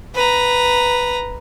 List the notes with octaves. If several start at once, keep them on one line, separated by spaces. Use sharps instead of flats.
B4 A#5